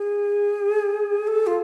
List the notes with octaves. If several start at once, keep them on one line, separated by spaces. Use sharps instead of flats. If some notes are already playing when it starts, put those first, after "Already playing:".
Already playing: G#4
A4
F4